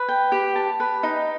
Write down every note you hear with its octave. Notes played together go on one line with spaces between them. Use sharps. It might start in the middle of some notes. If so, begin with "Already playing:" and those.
Already playing: B4
G5
G4
A5
B4
D#4